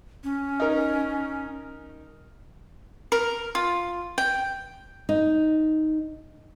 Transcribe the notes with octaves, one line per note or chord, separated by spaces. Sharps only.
C#4
D#4 A#4
A#4
F4
G5
D#4